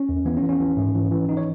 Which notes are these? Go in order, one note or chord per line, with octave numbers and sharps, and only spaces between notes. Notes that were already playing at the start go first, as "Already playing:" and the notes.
Already playing: C#4
E2
E3 B3
C#4
E3
C#4
E3
G#2
E3
E3
E3 D#4
C#5